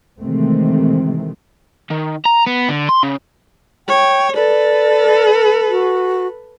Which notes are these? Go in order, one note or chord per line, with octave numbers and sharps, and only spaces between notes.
C3 D#3 E3 G#3 A3 C4
D#3
A#5
B3
D3
C6
C#3
C#5 G5
A4 B4 D5
F#4